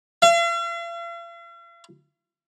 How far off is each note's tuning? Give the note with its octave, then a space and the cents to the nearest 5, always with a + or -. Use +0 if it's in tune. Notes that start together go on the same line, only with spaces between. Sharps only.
F5 -45